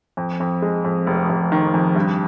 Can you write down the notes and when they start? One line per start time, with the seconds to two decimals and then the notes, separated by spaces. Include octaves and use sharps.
0.17 F2
0.40 F2
0.62 G#3
0.84 F2
1.07 F1
1.29 F1
1.52 D#3
1.74 F2
1.96 G2